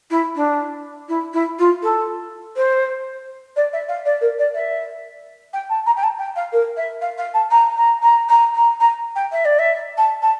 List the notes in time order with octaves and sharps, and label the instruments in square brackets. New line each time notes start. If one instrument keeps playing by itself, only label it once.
[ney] E4
D4
E4
E4
F4
A4
C5
D5
E5
F5
D5
A#4
D5
E5
G5
A5
A#5
G5
A5
G5
F5
A#4
E5
F5
F5
A5
A#5
A#5
A#5
A#5
A#5
A#5
G5
E5
D5
E5
A5
A5